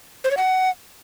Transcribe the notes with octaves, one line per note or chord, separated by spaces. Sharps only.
C5
C#5
F#5